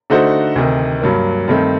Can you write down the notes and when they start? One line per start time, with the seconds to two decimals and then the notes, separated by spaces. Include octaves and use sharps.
0.10 D3 A3 D#4 F#4 C5
0.56 D2 C3 D#3
1.02 G2 F#3 A#3
1.48 G2 D#3 A3 C4